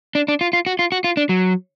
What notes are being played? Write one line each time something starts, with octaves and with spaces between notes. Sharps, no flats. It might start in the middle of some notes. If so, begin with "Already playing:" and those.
D4
D4
F4
F4
F#4
F4
F#4
F4
D4
F#3